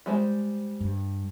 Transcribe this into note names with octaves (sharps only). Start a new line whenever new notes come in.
G3 G#3 C5
G2